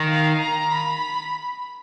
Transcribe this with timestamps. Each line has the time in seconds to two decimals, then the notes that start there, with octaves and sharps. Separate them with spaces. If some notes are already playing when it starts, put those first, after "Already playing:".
Already playing: D#3
0.09 F5
0.40 A#5
0.72 B5